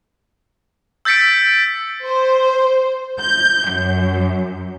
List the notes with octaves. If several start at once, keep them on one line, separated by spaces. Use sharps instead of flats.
E6 G6 A6 B6 C#7 D7
C5
G6
F#2